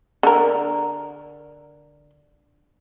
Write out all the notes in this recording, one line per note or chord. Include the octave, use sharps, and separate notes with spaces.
D3 A#4